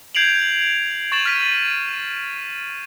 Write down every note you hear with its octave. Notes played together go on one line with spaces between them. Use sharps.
G6 G#6 C7 D7 F7 F#7
C#6 A6 E7 F#7
F6 B6 D#7